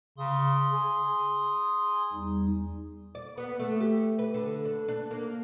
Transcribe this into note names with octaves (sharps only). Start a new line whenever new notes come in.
C#3 C6 D#6
G#4
E2 G3 D#4
D5
B3
A3
G4
B4
D3
D4
D4
A#3